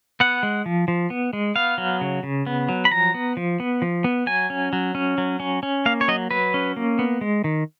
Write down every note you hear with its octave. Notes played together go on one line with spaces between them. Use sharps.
B3 F#5
G#3
F3
F3
B3
G#3
B3 F5
F#3
C#3
C#3
B3
F#3
B5
F3 A#5
B3
F3
B3
F3
B3
F#3 G#5
C#4
F#3
C#4
F#3
C#4
C#4
A#3 F5
C#5
F#3 D#5
F#3 B4
C#4
A#3
B3
G#3
D#3